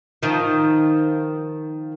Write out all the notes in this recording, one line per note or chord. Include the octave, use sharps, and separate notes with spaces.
D#3 F3